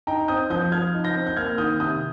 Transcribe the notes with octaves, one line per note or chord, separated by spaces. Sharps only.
D#4 G5 A#5
C4 D#6 G6
F3 D#6 G6
F3 F6 G#6
D#4
G6 A#6
C4
G6
A#3 F6 G#6
D#3 D#6 G6
C3 D#6 G6